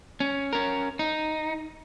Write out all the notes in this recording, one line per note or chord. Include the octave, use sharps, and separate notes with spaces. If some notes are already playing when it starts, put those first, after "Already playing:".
C#4
C#4 A#4
D#4